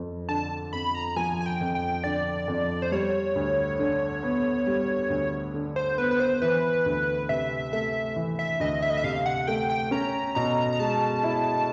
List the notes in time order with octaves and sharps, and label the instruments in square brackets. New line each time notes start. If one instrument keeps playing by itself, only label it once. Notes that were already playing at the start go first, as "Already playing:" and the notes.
Already playing: [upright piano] F2 F3
[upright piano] D3 [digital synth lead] A5
[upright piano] F2 [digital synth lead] B5
[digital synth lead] A#5
[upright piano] F3 [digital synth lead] G#5
[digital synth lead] G#5
G5
[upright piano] F2
[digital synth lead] G5
[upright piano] D3 [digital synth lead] D5
[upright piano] F2
[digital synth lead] C5
[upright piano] G3 [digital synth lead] C#5
[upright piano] D2
D3
B3
G3
D2
D3
[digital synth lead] C5
[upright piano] B3 [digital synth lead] B4
[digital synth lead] B4
C5
[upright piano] E3 [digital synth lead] B4
[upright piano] D2
[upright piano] C3 [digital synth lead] E5
[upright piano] A3 [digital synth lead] E5
[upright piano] E3
[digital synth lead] E5
[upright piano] D2 [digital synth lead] D#5
[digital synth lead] E5
D#5
E5
[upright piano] C3 [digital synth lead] F5
[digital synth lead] F#5
[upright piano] A3 [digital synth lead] G5
[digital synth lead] G5
[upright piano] C#4 [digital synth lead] A#5
[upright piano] B2 [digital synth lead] A#5
[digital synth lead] A#5
[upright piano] G#3 [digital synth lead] A5
[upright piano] E4